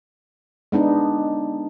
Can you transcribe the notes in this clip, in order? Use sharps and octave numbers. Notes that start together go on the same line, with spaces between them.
G#3 B3 D4 D#4